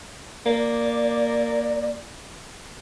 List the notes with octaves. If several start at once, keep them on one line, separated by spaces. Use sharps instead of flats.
A#3 D5